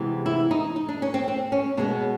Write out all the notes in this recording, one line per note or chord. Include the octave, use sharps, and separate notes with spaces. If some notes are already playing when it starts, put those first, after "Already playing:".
Already playing: C3 E3 G#3 B3
E4
D#4
D#4
D4
C#4
C4
C4
C#4
B2 G#3 B3 D4